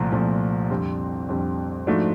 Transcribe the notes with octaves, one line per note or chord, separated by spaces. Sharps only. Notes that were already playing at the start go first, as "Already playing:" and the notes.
Already playing: C2 A#2 F3 A3
C2 A#2 F3 A3
F2 D3 G3 C4
F2 D3 G3 C4
G#2 F3 A3 D4 F#4